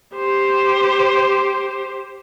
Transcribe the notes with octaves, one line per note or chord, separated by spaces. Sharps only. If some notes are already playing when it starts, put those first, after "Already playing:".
G4 C5